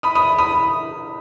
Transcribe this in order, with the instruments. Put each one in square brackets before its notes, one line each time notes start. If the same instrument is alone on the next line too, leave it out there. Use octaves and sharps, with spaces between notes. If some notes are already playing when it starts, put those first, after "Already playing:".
[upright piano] B5 D#6
B5 D#6
B5 D#6